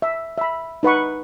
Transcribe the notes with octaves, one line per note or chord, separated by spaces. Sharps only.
E5
E5 B5
D#4 B4 F#5 C#6